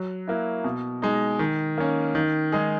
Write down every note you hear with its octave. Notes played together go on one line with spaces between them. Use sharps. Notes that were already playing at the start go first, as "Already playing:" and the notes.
Already playing: F#3
A#3 E4
B2
G#3 D#4
D#3
A#3 C#4
D#3
G#3 D#4 G#4